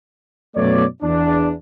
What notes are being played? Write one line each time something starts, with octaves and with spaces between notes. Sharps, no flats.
F#2 B2 A3 B3 C#5 D5
E2 D4